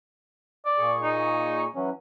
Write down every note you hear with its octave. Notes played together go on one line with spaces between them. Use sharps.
D5
A#2 G#4 C#6
D#4
E3 F#3 C#4